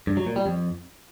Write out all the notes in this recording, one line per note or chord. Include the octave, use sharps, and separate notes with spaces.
G2
F#3
A#2
G3
F2